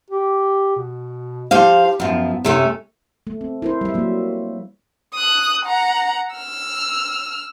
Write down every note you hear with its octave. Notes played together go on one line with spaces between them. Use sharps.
G4
B2
F3 G4 C5 F5
F#2 F3 B3
F#2 C3 A3 C#4
A3
C4
E4 A#4 C5
G3 E5
F#3 A#3
D#6 F#6
F#5 A#5
E6 F6